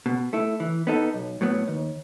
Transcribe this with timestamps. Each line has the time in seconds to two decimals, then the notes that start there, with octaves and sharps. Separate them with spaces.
0.06 B2
0.33 A3 E4
0.60 E3
0.87 B3 D#4 A4
1.14 B1
1.41 A2 F#3 B3
1.68 D#2